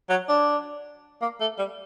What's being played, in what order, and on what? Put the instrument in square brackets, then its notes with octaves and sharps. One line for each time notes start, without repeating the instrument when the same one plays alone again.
[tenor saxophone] F#3
D4
A#3
A3
G3